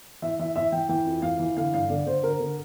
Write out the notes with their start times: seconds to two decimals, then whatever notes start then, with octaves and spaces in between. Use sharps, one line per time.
0.22 E3 E5
0.39 E3 E5
0.56 E3 E5
0.72 E3 G5
0.89 E3 G5
1.06 F2
1.22 E3 F5
1.39 E3
1.56 D3 F5
1.73 G2 F5
1.89 D3 D5
2.06 D3 C5
2.23 D3 A#4
2.40 D3